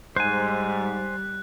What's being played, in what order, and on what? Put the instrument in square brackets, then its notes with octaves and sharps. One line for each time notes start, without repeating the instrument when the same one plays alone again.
[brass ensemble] G#2 [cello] G3 [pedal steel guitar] C5 G#5 [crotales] F#6